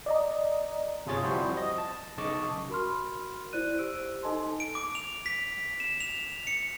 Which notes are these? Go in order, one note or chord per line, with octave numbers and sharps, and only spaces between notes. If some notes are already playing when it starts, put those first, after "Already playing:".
D5 D#5 A#5
G1 C3 F4 G#4 C#5 A6
F3 G3 C4 E4 F#4 C5
D#5
A5
B1 C#3 D#5 A5 C#6 D6
F#4 A#4 B5 C6 F6
E4 C5 D5 F#6 D#7
G4 C5 E6 D7
D#4 A4 D#5 G#5 A5 C6
D7
D6
F7
B6
E7
F7
C#7